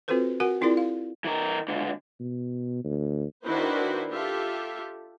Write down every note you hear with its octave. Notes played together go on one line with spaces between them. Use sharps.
C4 F4 F#4 A4 B4 C5
F#4 A#4 F#5 G#5
C4 E4 F4 G#4 A#4 D5
F5
E3 A#4
C#2 D3
B2
D2
D#3 D4 E4 F#4 B4 C5
F4 G4 A4 E5